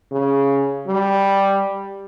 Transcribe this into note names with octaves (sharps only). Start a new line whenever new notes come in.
C#3
G3